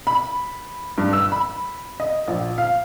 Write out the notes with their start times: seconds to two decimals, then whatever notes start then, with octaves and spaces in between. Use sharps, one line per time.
0.07 B5
0.98 G2
1.13 E6
1.32 B5
2.00 D#5
2.28 A#1
2.58 F5